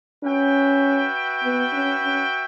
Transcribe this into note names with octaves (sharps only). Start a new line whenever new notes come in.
C#4 F#4 B4 E5 G5
B3
C#4
C#4